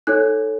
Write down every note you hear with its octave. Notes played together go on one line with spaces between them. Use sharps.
D#4 A4 C#5 F#6